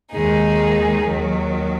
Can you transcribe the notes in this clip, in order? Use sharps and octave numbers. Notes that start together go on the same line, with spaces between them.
D#2 D#3 G#3 D#4 G#4
D#2 D#3 F#3